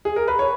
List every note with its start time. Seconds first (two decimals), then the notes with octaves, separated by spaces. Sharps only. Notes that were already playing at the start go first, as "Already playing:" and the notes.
0.05 G#4
0.16 A#4
0.28 B4
0.39 C#5